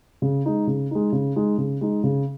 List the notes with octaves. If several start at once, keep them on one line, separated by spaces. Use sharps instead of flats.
C#3
G#3 D#4
C#3
G#3 D#4
C#3
G#3 D#4
C#3
G#3 D#4
C#3